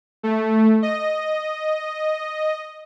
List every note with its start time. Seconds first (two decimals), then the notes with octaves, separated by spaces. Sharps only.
0.23 A3
0.82 D#5